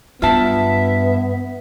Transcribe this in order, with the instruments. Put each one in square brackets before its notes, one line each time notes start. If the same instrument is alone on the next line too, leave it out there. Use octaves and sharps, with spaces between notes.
[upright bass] G2 [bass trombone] B3 [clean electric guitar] F4 A5 [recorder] E5